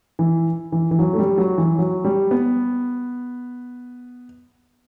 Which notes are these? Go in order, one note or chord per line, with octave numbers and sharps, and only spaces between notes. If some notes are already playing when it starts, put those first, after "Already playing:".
E3
E3
E3
F#3
A3
G3
F#3
E3
F#3
G3
B3